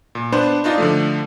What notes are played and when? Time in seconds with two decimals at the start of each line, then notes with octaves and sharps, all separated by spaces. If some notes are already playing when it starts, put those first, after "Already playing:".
0.15 A#2
0.32 B3 D4 B4 C5
0.64 D4 D#4 F4 D5 D#5
0.78 D3 F3 A3